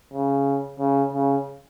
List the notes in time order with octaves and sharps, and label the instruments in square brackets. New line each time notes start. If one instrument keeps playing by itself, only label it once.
[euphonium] C#3
C#3
C#3